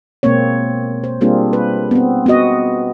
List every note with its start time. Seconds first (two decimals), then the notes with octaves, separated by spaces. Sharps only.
0.23 B2 G#3 A#3 C4 C#5
1.04 C5
1.21 G3 A#3 C4 D4 F4 G#4
1.53 B4
1.91 B3 C4
2.26 B3 C4 F#4 D#5